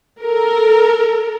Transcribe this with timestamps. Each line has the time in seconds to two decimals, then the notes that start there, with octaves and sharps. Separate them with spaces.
0.23 A4 A#4